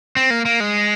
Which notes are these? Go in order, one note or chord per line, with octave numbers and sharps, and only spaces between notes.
C4
A#3
A#3
G#3